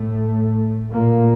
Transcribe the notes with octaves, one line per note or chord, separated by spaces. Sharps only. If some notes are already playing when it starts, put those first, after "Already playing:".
Already playing: A2 A3
A#2 A#3